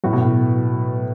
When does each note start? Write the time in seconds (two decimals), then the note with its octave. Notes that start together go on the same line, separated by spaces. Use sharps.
0.04 A2 F#3 B3 F#4
0.13 B2
0.21 A2